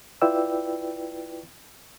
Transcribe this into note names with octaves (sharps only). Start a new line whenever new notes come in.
E4 F4 B4 D5 G5 E6